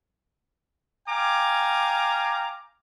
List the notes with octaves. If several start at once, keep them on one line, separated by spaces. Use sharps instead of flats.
F5 G5 G#5 A#5 D6